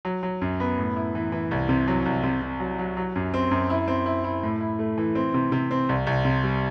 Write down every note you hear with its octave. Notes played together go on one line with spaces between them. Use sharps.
F#3
F#3
F#2
B3
A2
E4
E3
E3
C2
C3
F#3
C2
C3
C3
F#3
F#3
F#3
F#2
C4
F#2
E4
C4
E4
E4
A2
E4
A3
E3
C4
C3
C3
C4
C2
C2
C3
G3